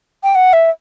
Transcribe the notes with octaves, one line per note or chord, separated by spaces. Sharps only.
G5
F#5
E5